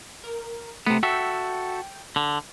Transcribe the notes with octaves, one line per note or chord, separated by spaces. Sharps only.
A#4
C3 A3 B3
F#4 A4 E5 G5
D3